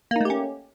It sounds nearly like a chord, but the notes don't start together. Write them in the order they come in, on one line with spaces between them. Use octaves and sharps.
A#3 D#4 A3 G4 C#4